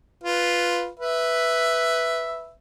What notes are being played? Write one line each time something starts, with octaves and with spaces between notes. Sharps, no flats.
F4 B4
B4 E5